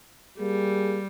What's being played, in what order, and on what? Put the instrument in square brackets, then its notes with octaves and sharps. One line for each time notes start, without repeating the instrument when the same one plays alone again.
[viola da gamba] G3 [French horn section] A#3 G4 G#4